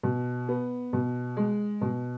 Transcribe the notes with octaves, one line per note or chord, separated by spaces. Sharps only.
B2
B3
B2
G#3
B2